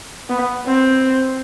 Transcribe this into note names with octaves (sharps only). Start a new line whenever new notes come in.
B3
C4